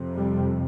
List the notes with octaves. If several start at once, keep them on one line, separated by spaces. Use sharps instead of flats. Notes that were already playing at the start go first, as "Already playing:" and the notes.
Already playing: F2 C3
G3